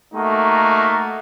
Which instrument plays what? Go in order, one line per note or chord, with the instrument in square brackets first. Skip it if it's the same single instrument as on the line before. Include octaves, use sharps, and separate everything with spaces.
[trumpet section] A3 A#3 D#4 F#4